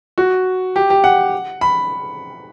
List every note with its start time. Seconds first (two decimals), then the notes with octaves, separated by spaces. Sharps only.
0.18 F#4
0.76 G4
0.90 G4
1.04 F#5
1.61 B5